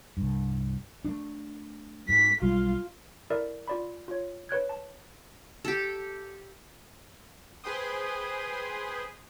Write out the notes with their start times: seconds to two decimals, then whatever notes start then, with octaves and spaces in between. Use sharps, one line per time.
0.17 C2 G2
1.05 A3 D4
2.09 G#2 B6
2.42 B1 G3 G#3 F4
3.30 E4 A4 A#4 D5 E5
3.68 F4 D5 B5
4.08 F4 C#5
4.49 B4 C#5 F#6 G#6
4.69 A5
5.65 G4 A4
7.64 G#4 B4 C5 G5 C6 D#6